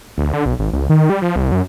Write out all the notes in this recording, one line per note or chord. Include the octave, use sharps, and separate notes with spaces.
D2
D3
B1
G#1
C#2
D#3
G3
F3
C2
F#2